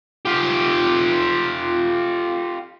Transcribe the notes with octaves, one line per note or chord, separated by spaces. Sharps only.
F4 G4